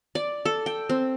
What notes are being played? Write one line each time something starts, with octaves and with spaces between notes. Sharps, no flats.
D5
A4
G5
C4